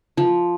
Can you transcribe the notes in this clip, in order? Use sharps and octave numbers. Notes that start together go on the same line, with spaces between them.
F3